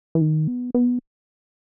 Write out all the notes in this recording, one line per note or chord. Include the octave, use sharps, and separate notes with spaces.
E3
D#3
B3
B3